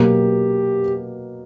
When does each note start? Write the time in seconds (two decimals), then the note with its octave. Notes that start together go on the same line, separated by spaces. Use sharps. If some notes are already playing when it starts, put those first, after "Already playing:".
Already playing: B2 F#3 A#3 G4